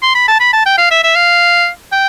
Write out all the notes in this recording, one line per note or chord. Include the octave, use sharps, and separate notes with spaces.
C6
B5
A5
B5
A5
G5
F5
E5
E5
F5
G5